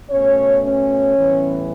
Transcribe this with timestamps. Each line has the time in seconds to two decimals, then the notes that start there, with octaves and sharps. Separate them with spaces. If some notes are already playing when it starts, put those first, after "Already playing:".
0.11 B2 A3 C#4 C#5
0.63 C#4 C#5
1.16 A2 E3 G3 B3